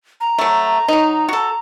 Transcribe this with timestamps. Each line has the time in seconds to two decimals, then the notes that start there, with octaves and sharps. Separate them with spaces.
0.21 A#5
0.38 F#3 A3
0.88 F#3 D#4
1.29 F#4 A4